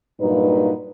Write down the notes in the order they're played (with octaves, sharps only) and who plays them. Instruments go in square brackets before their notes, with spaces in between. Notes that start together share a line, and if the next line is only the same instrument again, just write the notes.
[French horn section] G2 A#2 F#3 D#4 B4